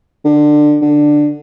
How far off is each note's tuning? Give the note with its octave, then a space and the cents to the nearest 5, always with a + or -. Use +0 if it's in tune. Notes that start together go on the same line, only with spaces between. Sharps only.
D3 +20
D3 +10